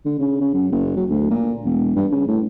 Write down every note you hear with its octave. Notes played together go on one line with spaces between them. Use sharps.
D3
C#3
C#3
F#2
F#1
F#3
D2
A#2
E1
G2
C#3
A2